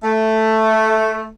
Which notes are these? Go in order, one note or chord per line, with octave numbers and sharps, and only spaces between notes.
A3